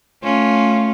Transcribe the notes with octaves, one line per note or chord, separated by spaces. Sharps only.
A3 C#4 F4